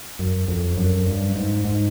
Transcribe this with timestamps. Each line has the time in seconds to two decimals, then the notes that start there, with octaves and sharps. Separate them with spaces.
0.19 F#2
0.48 F2
0.77 F#2
1.06 G2
1.36 G#2
1.65 G#2